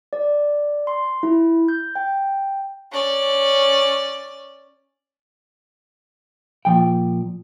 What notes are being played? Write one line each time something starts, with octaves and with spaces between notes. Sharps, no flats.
D5
C6
E4
G6
G5
C#4 D5
A#2 F3 G5